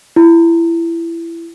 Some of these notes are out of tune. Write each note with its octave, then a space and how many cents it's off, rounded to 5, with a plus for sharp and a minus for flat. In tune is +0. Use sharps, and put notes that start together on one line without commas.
E4 +20